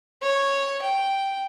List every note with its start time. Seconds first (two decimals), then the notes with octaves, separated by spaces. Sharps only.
0.22 C#5
0.81 G5